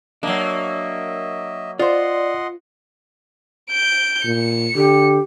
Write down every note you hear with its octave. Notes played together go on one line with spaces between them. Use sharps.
F#3 A#3 D4 D#5 E5
F4 C5 D5 D#5 F#5 C6
G6 D7
A#2 C#7
D3 G4